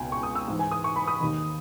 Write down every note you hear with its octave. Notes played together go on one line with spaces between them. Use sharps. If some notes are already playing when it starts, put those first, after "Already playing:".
Already playing: C#2 B2 G5 G#5
C#6
D#6
E6
G#2 E3
G#5
D#6
C#6
B5
D#6
D#2 D#3